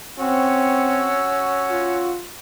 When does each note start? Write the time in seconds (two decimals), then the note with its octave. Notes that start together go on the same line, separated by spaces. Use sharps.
0.19 C4 C#4 F#4 E6
1.71 F4